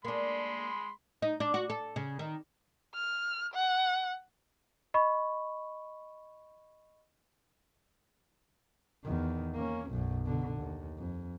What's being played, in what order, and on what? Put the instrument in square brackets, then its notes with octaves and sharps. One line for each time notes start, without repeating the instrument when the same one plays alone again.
[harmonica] G#3 B5 C6 [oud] A#3 D4
[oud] D#4
D4
F#4
A4
C#3
D#3
[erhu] F6
F#5
[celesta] D#5 B5 C#6
[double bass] E2 D#3
A#3 C#4
B1 F#2
B2 D3
D#2
F2